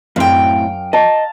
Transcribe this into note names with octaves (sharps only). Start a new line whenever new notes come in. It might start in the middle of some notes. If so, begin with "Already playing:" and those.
F#2 A2 C4 F5 G5
D#5 A5 A#5